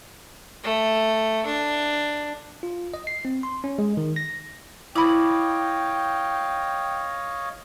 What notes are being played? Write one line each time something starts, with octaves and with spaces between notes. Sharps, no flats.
A3
D4
F4
D#5
C7
C4
C6
C#4
G#3
D#3
A#6
E4 C#5 D#5 F5 G5 B5 D6